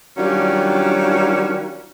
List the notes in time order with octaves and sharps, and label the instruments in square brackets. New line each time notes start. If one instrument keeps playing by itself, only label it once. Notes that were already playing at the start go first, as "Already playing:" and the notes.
[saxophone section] D#3 F#3 G3 C#4 D4 F4